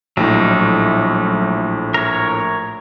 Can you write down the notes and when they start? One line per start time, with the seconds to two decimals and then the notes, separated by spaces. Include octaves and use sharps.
0.17 A#1 A2 F#3 G3 D#4
1.94 A#4 C#5